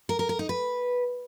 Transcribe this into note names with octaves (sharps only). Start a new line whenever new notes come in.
A#4
A#4
A#4
D#4
B4